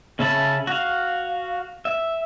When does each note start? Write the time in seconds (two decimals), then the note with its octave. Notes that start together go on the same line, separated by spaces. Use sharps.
0.19 C#3 C#4 E5 A5 B5
0.67 F#4 F5
1.85 E5